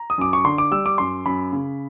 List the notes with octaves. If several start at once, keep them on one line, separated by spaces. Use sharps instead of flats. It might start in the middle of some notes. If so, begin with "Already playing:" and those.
Already playing: A#5
D#6
F#2 D6
C#6
D3 C6
D6
G3 E6
D6
F#2 C6
F#2 B5
C#3